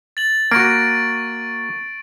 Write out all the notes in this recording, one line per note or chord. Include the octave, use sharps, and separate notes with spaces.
A6 F#7
A#3 F#4 C#6 D7